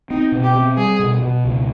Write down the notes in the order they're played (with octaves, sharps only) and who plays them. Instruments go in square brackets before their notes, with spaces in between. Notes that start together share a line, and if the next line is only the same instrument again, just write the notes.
[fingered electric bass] C4 [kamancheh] D#4
[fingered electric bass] B2
[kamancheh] G4
[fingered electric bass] C4
[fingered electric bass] G3 [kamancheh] G#4
[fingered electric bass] B2
B2
C#2